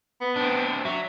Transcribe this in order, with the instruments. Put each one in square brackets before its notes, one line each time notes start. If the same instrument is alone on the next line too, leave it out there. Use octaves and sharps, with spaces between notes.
[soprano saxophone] B3
[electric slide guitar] C4 D4
[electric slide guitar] F#3 [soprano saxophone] E5